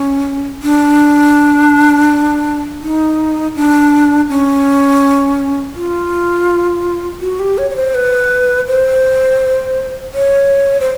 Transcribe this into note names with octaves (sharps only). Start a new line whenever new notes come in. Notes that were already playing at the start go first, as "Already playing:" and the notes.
Already playing: C#4
D4
D#4
D4
C#4
F4
F#4
G4
C#5
C#5
C5
B4
C5
C#5
C5